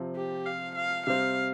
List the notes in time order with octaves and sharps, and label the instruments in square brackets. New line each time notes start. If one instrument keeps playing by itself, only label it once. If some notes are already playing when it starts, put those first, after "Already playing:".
Already playing: [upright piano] C3 F3 C4
[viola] G4
F5
F5
[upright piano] C3 G3 C4 [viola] F5